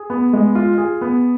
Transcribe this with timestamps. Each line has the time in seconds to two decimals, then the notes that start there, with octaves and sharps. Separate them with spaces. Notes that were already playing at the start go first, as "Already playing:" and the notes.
Already playing: G#4
0.10 B3
0.33 G#3
0.55 F4
0.78 G#4
1.01 B3